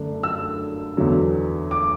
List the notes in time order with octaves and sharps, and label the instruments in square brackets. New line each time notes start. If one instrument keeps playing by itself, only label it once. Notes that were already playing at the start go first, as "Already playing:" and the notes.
Already playing: [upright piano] F#2 D3 A3 D4
E6
E2 D3 F#3
D6